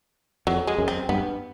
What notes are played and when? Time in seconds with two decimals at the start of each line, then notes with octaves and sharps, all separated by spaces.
0.47 F2 F#3
0.67 G#3
0.78 F#2
0.88 C4
1.09 G2 B3